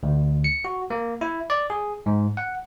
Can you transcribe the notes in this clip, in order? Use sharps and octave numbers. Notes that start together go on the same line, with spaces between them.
D2
C#7
F#4
A#3
E4
D5
G#4
G#2
F#5